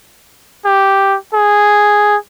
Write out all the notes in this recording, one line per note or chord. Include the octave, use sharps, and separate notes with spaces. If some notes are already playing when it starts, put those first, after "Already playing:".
G4
G#4